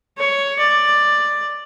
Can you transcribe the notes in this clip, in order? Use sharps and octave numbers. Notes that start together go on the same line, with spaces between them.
C#5
D5